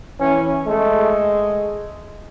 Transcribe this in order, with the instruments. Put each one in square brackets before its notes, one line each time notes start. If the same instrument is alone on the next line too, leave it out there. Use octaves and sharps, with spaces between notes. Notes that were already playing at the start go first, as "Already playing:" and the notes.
[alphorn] E3 [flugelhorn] C#4
[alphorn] G#3 [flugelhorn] A3